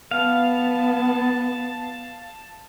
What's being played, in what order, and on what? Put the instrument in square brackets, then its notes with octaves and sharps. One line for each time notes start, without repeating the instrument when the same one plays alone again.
[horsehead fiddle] B3 [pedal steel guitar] F5 [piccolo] A5